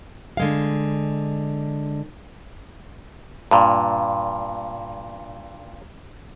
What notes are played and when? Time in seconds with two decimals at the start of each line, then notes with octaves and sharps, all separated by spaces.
0.37 D3 G#3 F5
3.51 G2 A#2